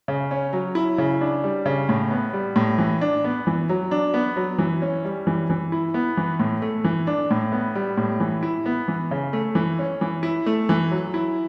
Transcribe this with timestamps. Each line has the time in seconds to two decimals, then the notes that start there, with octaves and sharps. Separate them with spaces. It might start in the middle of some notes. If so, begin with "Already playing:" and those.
0.08 C#3
0.31 C#4
0.53 F#3
0.75 E4
0.98 C#3
1.21 D4
1.44 G3
1.66 C#3
1.89 A2
2.11 B3
2.33 G3
2.56 A2
2.78 E3
3.01 D4
3.24 B3
3.47 E3
3.69 F#3
3.91 D4
4.14 B3
4.36 F#3
4.59 E3
4.82 C#4
5.05 G3
5.27 E3
5.50 E3
5.72 E4
5.94 B3
6.17 E3
6.39 A2
6.62 A3
6.84 E3
7.07 D4
7.31 A2
7.52 B3
7.75 G3
7.97 A2
8.20 E3
8.43 E4
8.66 B3
8.88 E3
9.11 C#3
9.33 A3
9.55 E3
9.79 C#4
10.01 E3
10.23 E4
10.46 A3
10.69 E3
10.91 F#3
11.14 E4